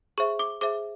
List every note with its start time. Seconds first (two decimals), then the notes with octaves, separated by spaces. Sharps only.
0.18 G#4 C5 E5 C#6
0.39 D6
0.61 G#4 C5 E5 D6